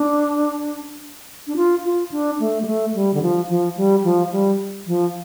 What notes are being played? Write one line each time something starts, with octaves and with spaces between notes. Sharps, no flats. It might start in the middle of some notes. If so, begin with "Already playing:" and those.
Already playing: D4
D4
F4
F4
D4
A3
G3
A3
G3
D3
F3
F3
G3
F3
G3
F3